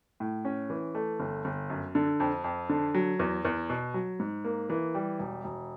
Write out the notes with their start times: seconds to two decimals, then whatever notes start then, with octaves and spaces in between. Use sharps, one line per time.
0.20 A2
0.45 C#4
0.70 E3
0.95 A3
1.20 G1
1.45 G1
1.70 F#2
1.95 D3
2.20 F2
2.44 F2
2.69 D3
2.94 F#3
3.20 E2
3.45 E2
3.70 B2
3.94 F#3
4.19 G#2
4.44 A#3
4.70 E3
4.95 G3
5.19 E1
5.44 E1